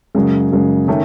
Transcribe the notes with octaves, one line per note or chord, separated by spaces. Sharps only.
F#2 C#3 G#3
F#2 C#3 G#3
D#3 A3 C#4